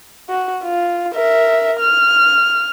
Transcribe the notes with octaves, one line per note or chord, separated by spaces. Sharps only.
F#4
F4
A#4 E5
F6